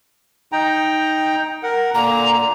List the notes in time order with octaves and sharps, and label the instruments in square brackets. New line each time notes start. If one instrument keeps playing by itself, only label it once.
[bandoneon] D#4 G5 A#5
A#4 F#5
[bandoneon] A#2 D3 A#3 [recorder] A#5